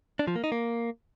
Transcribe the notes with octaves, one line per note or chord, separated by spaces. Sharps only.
D4
F3
A#3
D#4
A#3